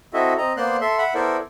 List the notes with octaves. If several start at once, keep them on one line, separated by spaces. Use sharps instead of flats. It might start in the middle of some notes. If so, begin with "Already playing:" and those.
C4 E4 F#4 A4 D#5 E5
C4 D#5 A#5
A#3 B3 C5 D5 C6 F#6
A4 E5 C6
E5 F#5 B5
B3 E4 A4 A#4 C5 D5